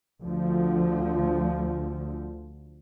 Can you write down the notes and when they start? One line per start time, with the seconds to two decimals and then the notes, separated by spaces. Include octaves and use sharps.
0.22 D2 D3 F3